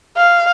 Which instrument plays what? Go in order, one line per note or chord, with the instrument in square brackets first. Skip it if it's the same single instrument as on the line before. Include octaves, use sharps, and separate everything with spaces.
[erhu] F5